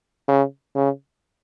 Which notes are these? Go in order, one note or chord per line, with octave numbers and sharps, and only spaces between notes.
C#3
C#3